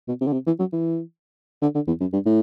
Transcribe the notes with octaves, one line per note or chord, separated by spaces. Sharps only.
B2
C3
D3
C3
E3
F#3
E3
D3
D3
E2
F#2
G2
A2